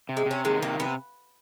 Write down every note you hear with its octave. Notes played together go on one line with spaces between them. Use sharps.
C3
G#3
C3 C#4
D#3 G#3
C3 A#3
C3 B3